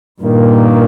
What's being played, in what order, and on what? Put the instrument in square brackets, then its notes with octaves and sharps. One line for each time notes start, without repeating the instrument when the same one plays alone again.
[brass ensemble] G2 D#3 A#3 [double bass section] A#2